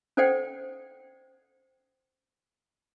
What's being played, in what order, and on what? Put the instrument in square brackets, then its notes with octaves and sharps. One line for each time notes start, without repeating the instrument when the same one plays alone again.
[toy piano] C#4 A4 C5 D5 F#5 G5